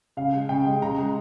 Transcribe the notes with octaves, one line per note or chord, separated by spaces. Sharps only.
C#3 F5
G#3
C#3 G5
G#3
C#3 A#5
G#3